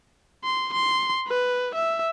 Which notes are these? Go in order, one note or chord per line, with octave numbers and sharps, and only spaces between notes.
C6
C6
B4
E5